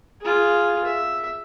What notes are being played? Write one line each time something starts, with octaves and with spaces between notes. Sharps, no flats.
F4 G#4
E5